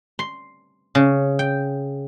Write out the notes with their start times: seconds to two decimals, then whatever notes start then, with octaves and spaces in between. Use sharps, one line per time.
0.19 C6
0.95 C#3
1.39 G5